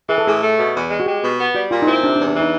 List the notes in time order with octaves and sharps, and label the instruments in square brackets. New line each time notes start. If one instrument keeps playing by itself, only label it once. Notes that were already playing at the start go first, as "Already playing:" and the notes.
[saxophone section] E3 [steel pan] G#4
[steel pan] A4
[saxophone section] A2 [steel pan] G#4
[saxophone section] A3
B2
E2
G#3
[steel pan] F#4
[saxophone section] G#3 [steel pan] G4
[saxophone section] B2
B3
[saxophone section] G3 [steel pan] F#4
[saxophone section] A#2 [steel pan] F4
[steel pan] D#4
[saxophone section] C4 [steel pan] E4
[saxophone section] C3 [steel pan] D4
[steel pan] D4
[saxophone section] E2
[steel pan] D4
[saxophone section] E3 [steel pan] D#4